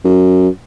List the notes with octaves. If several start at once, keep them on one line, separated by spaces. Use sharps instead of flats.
F#2